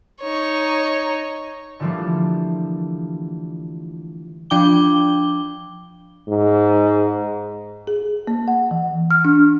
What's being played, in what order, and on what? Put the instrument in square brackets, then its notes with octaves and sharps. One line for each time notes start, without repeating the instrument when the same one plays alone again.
[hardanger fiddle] D#4 C#5
[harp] D3 E3 F3 G3 A3 A#3
[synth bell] F3 D4 G5 D6 G7
[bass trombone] G#2
[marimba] G#4
A#3
F#5
E3
F6
D4